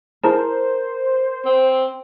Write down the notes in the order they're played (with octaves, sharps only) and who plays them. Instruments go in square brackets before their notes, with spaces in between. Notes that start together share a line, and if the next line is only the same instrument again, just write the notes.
[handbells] E4 G#4 A5 [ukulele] A#4 [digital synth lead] C5
[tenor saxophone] C4